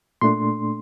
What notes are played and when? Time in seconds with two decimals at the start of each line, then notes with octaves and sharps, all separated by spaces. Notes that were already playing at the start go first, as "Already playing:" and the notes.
0.21 A#2 A3 D4 C6